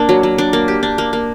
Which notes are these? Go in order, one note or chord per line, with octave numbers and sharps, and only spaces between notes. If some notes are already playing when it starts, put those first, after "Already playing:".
Already playing: A#3 D4
F#3
F#3
D4
A#3
G4
D4
A#3
A#3